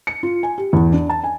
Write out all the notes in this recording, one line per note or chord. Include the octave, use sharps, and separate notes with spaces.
C#7
F4
G#5
G4
E2
D4
A5
G#5